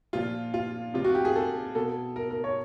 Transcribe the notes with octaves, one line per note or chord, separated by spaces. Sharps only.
A#2 F3 F4
F4
C3 F3 F4
F#4
G4
G#4
A4
B2 A4
A#4
A#4
C#5